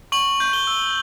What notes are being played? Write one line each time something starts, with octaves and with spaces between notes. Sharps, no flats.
C#6 F#7
G6
G7
E6